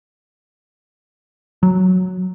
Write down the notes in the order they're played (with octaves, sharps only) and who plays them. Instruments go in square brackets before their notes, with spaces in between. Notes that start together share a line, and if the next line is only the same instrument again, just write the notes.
[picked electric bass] F#3